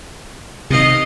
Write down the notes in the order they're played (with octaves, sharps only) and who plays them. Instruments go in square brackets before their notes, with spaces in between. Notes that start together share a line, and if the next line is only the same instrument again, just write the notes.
[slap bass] C3 D#3 [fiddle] D#5 F5